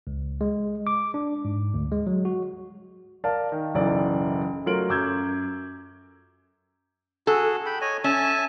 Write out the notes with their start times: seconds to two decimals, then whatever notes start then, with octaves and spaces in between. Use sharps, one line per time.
0.07 C#2
0.41 G#3
0.87 D6
1.14 D4
1.45 G#2
1.74 D2
1.92 G#3
2.07 F#3
2.25 F#4
3.24 A#4 D5 F5 A5
3.52 D#3
3.74 F#1 B1 E3 D5
4.66 F#3 A3 F4 A#4 D7 F#7
4.89 F#2 D6 E6 G6 G#6
7.27 F#4 G#4 A4
7.66 G5 B5
7.81 C#5 D#5 G#5
8.04 C#4 E5 G#5 A5